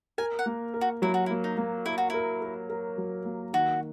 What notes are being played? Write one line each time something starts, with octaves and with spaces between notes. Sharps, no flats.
A#4 G#5
F#5
A#3
A#4
F#4
F#3 E4
F#4
E4
A#3
D#4
A#3
E4 A#4
F#4
E4 A#4
A#4
A#4
F#3
A#3
D#3 F#4